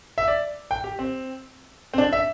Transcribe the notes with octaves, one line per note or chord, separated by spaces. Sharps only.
E5
D5
G5
G4
C4
C4
D4
E5